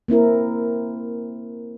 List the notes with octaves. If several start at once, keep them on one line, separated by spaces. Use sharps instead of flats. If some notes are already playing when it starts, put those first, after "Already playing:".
A#3 C4 E4 A#4